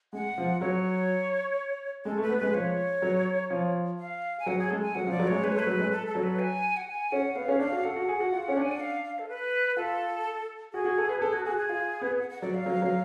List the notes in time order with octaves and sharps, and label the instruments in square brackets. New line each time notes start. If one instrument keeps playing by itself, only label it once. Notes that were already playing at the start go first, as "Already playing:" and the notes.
[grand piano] G#3 [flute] F#5
[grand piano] F3
[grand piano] F#3 [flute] C#5
[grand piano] G#3 [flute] A4
[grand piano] A3
[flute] B4
[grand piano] B3
[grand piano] G#3 [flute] B4
[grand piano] F3 [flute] C#5
[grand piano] F#3
F3
[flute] F5
G#5
[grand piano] F#3 [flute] F#5
[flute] G#4
[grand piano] G#3 [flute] A4
[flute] G#5
[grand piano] F#3 [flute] F#5
[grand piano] F3
[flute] D5
[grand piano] F#3
[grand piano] G#3 [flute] C#5
[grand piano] G#3 [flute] B4
[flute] C#5
[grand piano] A3
[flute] B4
[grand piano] F#3
G#3
[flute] A4
A4
[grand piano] F#3
[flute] B4
G#5
F#5
G#5
[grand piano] C#4 [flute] F#5
[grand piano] B3 [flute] F5
[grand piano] C#4
[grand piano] D4 [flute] F5
[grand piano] F#4
[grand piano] A4 [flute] F#5
[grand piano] F#4
G#4
F#4
F4
C#4
[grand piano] D4 [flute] G#5
[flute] F#5
F5
F5
A4
B4
[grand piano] F4 [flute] A4
[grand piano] F#4 [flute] G#4
[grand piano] F#4
A4
B4
[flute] G#4 [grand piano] A4
[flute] F#4
[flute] F#4 [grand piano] G#4
[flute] G#4
[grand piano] F4
B3
[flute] F#5
F#5
[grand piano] F#3 [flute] D5
[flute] F5
[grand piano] F#3
F#3